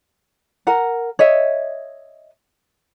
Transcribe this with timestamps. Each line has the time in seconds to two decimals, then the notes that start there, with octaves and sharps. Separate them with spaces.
0.67 A#4 F#5
1.19 C#5 D#5 E5